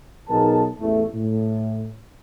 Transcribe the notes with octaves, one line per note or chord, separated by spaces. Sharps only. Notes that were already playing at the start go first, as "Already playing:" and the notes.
B1 B3 D#4 G#4 A#4 A5
A1 E2 E3 A3
A2